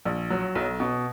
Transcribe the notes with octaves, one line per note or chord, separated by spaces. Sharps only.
A#1
F#3
B1
B2